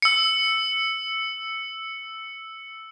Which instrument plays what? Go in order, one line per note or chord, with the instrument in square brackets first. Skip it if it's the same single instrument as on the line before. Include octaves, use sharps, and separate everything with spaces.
[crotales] E6 C#7